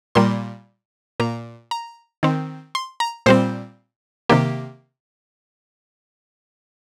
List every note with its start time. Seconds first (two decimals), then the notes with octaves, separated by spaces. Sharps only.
0.15 A#2 G3 A#3 C6
1.20 A#2 A#3 A#5
1.71 A#5
2.23 D#3 C4
2.75 C6
3.00 A#5
3.26 A#2 G3 C4 C5
4.29 C3 D#3 A#3 G4